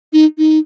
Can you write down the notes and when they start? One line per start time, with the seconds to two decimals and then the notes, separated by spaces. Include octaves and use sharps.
0.13 D#4
0.38 D#4